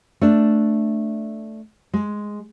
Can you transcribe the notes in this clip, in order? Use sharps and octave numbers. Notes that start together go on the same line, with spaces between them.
A3 D4
G#3